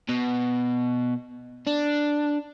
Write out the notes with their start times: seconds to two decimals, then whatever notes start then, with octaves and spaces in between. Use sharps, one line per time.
0.09 B2
1.67 D4